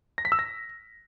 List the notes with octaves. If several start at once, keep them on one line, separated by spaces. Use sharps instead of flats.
A#6
B6
E6
A#6